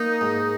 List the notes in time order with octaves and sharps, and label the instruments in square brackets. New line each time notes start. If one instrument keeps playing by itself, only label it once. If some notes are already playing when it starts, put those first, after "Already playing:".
Already playing: [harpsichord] A#3 [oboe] D#4
[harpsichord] G#2